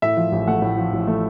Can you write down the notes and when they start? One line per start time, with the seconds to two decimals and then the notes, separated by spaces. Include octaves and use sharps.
0.02 A2 E5
0.17 F3
0.32 A1
0.47 A3 F#5
0.62 A2
0.77 F3
0.93 A1
1.07 A3